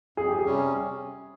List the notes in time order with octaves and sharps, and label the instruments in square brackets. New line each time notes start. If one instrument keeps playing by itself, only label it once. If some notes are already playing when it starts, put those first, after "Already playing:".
[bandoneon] F2 [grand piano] G#4
[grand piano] G4
G#4
[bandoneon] C3 G3 C#4